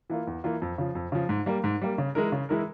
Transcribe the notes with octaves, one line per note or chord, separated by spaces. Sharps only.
E3 A#3 F4
E2
E3 A#3 F4
F2
C#3 F3
F2
C#3 F3
G#2
G3 A#3
G#2
G3 A#3
C#3
E3 G#3 E4 A#4
C#3
E3 G#3 E4 A#4